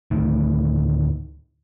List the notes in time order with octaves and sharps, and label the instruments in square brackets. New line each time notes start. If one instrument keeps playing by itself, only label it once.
[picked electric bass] D2 A2 D#3